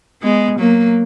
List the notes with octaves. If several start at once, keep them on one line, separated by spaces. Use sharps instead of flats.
G#3 B3
F#3 A#3